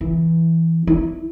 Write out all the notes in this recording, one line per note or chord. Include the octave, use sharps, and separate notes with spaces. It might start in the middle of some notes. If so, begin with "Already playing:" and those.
E3
E4